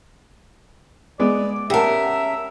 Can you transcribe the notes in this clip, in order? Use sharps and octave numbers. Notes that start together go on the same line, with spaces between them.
G#3 B3 D5
C#3 G4 A#4 E5 F#5 A5